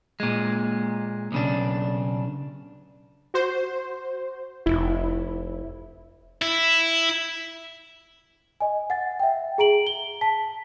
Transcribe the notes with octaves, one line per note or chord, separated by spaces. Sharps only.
A#2 G#3
B1 C#3 D4
F#4 C5
F1 E4
E4
D#5 G#5
F#5 A6
E5 G5
G#4 A#5 D7 F#7
G7
A5 B6